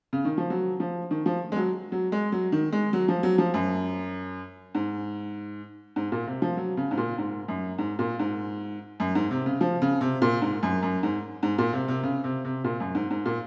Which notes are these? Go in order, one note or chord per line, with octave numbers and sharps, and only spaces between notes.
C#3
D#3
F3
F#3
F3
D#3
F3
G#3
F#3
F#3
G#3
F#3
D#3
G#3
F#3
F3
F#3
F3
F#2
G#2
G#2
A#2
C3
F3
F#3
C#3
G#2
A#2
G#2
F#2
G#2
A#2
G#2
F#2
G#2
C3
C#3
F3
C#3
C3
A#2
G#2
F#2
F#2
G#2
G#2
A#2
C3
C3
C#3
C3
C3
A#2
F#2
G#2
G#2
A#2